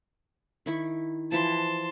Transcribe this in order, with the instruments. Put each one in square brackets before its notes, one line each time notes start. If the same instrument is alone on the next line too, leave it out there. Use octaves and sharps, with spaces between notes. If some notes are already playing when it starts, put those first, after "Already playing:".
[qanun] D#3 E4 C#6
[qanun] E3 F3 [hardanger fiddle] A5 C6